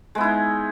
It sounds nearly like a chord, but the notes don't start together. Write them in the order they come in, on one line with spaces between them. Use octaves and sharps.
G#3 B3 E4 D#4